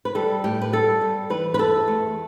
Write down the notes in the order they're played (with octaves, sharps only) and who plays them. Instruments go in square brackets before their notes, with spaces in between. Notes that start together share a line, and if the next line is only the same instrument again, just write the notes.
[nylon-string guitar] B4
G3 A4
A2 G4
B4
G3 A4
G3
E3 B4
B4
E2 A4
A3